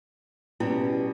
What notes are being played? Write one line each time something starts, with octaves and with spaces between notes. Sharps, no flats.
B2 G3 C#4 E4